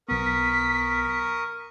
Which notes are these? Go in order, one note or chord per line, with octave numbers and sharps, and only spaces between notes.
B1 B3 A#4 C#6 D#6 B6